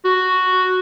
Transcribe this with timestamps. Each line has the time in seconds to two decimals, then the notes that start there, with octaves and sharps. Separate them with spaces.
0.05 F#4